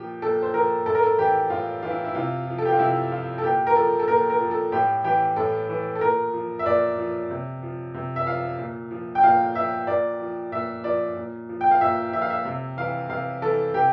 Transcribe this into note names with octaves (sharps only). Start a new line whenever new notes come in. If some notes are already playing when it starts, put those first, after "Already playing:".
Already playing: A#2 F3 G4
A#2 A4
C5
F3 A#4
A2 A4
A#4
A4
E3 G4
A2 F4
E3 F4
E4
E4
C3 F4
F3
A4
G4
F4
C3 E4
F3 F4
A4
A#2 G4
A#4
F3 A4
A4
A#2 A#4
A#4
F3
A4
A2 G4
E3 G4
A2 A4
E3
A4
A#2 A#4
F3
E5
A#2 D5
F3
C3
F3
C3
E5
F3 F5
A#2
F3
G5
A#2 F5
F3 E5
A#2 D5
F3
A#2 E5
F3 D5
A#2
F3
G5
F5
A#2 E5
F3 E5
F5
E5
C3
E3 F5
C3 F5
E3 A4
C3 G4